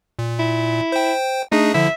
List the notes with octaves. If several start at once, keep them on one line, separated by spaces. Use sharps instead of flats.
A#2
E4
C5 G5
A3 D4 D#4 G#4
D3 F3 E4 E5